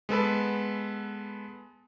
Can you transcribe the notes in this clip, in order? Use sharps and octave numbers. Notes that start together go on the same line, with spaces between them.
G#3 B3 A4 B4